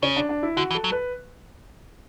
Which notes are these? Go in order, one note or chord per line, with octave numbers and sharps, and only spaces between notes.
C#3 C#4
D4
D4
E4
D3 F#4
E3
A4
F#3
B4